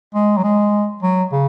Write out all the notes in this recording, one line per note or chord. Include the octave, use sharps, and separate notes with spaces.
G#3
F#3
G#3
F#3
C#3